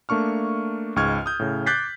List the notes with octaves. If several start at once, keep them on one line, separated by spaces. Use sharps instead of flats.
A3 A#3 D4 C#6 F6
C#2 G#2 C#6 F6 G#6
D#6 G6
A2 C#3
D6 F#6 G6 A6 B6 C7